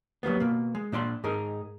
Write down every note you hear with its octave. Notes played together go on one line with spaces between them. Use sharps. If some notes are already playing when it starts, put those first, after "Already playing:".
F#3 G3 A#3 B3
B2 A#3
G#3
A#2 D4 D5 C6
G#2 D#4 G#4 A#4